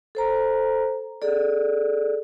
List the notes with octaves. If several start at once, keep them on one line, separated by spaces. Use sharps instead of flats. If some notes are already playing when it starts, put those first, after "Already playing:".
A4 C5 A#5
G#4 A4 D5